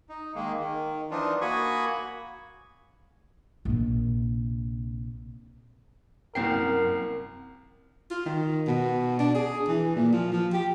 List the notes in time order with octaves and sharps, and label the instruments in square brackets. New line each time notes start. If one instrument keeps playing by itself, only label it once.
[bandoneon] D#4
D#3 G#3 A#3
D#3
E3 F3 D4 D#4 F4
A#3 F#4 G#5 B5 C#6 D#6
[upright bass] A#1 C3
[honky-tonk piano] C2 A#3 C7 [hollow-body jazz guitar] F#2 C4 G5 [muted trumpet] A#4
[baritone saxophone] F4
D#3
B2
D4
G#4
E3
A#2
F3
F3
G4